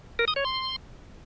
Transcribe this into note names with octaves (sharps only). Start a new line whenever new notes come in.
A#4
D#6
C#5
C6